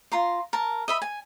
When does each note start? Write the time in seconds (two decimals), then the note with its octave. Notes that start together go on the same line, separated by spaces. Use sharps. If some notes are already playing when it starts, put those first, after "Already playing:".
0.12 F4 A#5 C6
0.53 A#4 A5
0.88 D#5 E5 B5
1.02 G#5